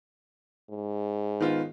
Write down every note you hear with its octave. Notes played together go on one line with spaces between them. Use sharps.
G#2
D#3 B3 F4